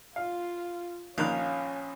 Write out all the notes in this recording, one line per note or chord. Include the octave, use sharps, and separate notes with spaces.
F4 F5
A#1 D#3 C#4 F5 F#6